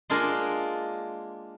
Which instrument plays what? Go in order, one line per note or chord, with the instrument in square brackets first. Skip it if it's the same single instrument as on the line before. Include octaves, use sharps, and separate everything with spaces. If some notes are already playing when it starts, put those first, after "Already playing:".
[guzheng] G#3 A#3 D4 F4 G#4 A#4